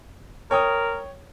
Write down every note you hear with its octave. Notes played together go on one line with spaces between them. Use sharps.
A#4 C#5 G5 D#6